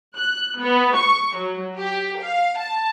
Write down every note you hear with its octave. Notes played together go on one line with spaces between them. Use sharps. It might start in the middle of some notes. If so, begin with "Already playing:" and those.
F#6
B3
C#6
F#3
G4
F5
A5